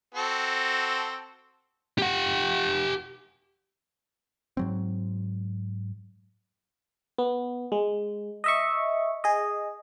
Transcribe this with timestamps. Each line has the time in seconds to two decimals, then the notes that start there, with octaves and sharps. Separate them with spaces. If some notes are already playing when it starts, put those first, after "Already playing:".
0.15 C4 F#4 A4
1.98 G4 F#5
4.57 G#2 F#3 C4
7.18 B3
7.72 G#3
8.44 D#5 E5 C#6
9.24 G#4 D#5